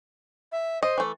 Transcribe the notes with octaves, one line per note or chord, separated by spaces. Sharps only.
E5
C5 D#5
E3 A3